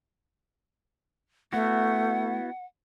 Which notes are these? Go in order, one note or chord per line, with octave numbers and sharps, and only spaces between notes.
A3 B3 E4 F#4 F#5